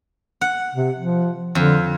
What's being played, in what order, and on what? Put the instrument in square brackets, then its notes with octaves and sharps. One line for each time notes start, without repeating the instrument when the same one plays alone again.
[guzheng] F#5
[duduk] C3
F3
[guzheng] F2 [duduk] D3